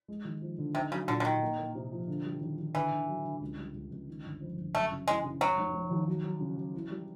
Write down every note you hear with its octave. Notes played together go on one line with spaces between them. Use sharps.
G#3
D#2
F3
D3
C3 D#4
C#3 F#3
A#2 D3
D3
D#3 D#4
A#3
A#3
C3
F3
D3
G3
D#2
D#2
D3 E3
D3
F#3
D3
C#2
G3
C#2
C#2
D#3
G1
F2
G1
F#2 A3
C#3
E3 G#3
C#3
F1 F#3
F1
F1
D#2
F#3
F#3
C#3
F#3
E3
G3